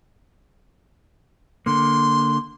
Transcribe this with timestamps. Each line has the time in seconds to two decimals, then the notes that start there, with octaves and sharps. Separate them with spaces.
1.66 D3 A#3 C6